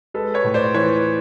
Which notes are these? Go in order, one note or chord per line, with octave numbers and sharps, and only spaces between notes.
G#3 A4 B4
B4 C#5
A2
C5 D5
E3 B4 C#5